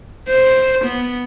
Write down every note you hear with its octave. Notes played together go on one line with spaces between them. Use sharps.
C5
B3